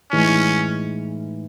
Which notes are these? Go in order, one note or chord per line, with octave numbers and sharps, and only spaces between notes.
A2 E3 G#3 C#4 D#4